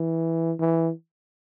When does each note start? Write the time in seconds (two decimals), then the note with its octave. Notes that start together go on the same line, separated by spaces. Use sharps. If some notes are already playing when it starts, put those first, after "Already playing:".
Already playing: E3
0.60 E3